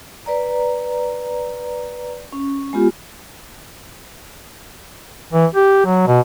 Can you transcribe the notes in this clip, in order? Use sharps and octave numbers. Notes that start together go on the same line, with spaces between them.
B4 D5 A#5
C#4
G#3 B3 F4 G4
E3
G4
F#3
B2